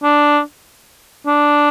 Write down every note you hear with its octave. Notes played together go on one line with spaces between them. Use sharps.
D4
D4